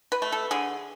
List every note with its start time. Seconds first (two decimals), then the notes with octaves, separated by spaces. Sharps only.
0.12 B4
0.22 A3
0.32 A4
0.51 D3 G#4